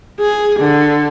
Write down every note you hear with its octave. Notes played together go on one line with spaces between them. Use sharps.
G#4
D3